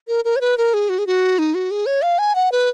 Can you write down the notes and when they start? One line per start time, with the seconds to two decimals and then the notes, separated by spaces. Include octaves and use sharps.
0.08 A#4
0.25 A#4
0.36 C#5
0.41 B4
0.58 A#4
0.74 G#4
0.89 F#4
0.99 G#4
1.07 F#4
1.39 D#4
1.55 F#4
1.71 G#4
1.86 C#5
2.02 F5
2.19 G#5
2.35 F#5
2.52 B4